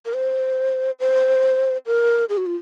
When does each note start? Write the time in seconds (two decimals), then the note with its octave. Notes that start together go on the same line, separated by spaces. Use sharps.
0.05 A#4
0.14 C5
1.00 C5
1.86 A#4
2.29 G#4
2.37 F#4
2.46 F4